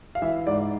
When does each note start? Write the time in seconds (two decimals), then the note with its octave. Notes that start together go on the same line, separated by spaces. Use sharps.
0.15 F5
0.22 E3 E5
0.47 G#2 D5